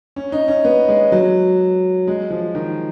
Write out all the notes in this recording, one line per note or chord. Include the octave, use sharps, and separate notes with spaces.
C#4
D#4
C#4
B3
G#3
F#3
G#3
F3
D#3